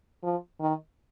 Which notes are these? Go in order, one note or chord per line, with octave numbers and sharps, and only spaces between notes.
F3
D#3